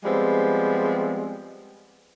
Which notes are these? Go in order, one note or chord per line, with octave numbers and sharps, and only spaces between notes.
F3 G3 G#3 B3 C4